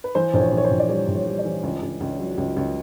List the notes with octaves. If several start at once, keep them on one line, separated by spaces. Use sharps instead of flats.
B4
E3 C5
A#1 C5
C#5
A#1 C#5
C5
A#1
D5
G3 C#5
A#1
C#5
G3
D5
E3
C#2
C#2
C#2
F#3
C#2
C#2